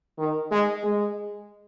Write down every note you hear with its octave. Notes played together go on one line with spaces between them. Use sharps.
D#3
G#3
G#3